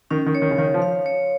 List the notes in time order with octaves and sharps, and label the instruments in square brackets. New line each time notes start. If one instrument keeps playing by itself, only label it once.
[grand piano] D#3 [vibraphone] C#4
[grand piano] D#3
[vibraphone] C#5
[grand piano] D#3
C#3
[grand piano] D#3 [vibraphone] F5
[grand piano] F3
[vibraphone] F5
C#5